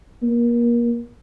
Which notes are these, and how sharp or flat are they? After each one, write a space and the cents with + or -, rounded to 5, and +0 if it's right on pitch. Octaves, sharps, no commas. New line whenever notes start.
A#3 +30